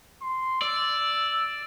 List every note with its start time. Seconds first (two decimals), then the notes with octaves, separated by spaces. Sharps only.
0.22 C6
0.62 D5 E6